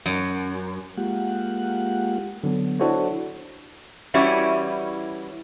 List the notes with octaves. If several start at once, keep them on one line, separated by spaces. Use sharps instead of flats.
F#2
G#3 A#3 F4 G4 F#5
D3 F#3 B3
D4 E4 F#4 A4 C5 C#5
E3 G3 C#4 E4 F#4